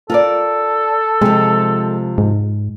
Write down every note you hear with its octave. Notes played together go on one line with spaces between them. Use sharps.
F4 A4 A#4 D5
C3 F3 G#3
G#2